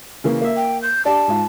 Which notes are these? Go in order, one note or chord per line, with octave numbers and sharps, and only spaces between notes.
C#3 E3 A#3
A#3 E5
G5
G6
D4 G4 D5 A5
G#2 F4